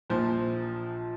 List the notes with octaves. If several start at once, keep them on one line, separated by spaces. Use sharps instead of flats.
A#1 A#2 F3 C5